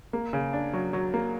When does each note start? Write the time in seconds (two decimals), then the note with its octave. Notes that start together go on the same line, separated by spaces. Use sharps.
0.13 A#3
0.33 C#3
0.53 D4
0.74 F#3
0.93 F#3
1.14 A#3